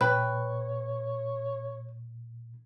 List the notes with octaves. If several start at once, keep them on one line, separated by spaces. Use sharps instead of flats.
A#2 B4 C#5 G5 B5 F#6